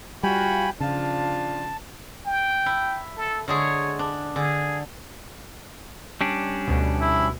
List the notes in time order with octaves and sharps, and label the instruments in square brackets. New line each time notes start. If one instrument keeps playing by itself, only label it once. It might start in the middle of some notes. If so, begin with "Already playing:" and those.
[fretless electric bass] G3 [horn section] F4 F#4 [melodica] G5 G#5 B5
[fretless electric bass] C#3 [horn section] F3 D4 F4 [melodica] A5
[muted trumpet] G5
[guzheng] E4
[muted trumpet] A4
[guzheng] D3 G#3 G#4 [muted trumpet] C#5
[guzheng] D4
[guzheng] D3 [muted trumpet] G#4
[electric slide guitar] G3 C#4 D4
[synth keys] D2 B2
[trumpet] E4